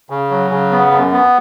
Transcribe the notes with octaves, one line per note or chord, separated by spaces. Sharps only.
C#3
F#3
C#3
B3
F#2
B3